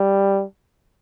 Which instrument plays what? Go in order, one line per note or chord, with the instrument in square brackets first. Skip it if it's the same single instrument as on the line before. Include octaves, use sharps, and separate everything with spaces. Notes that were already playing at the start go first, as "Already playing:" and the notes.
Already playing: [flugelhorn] G3